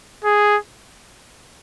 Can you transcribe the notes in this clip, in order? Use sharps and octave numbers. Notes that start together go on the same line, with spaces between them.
G#4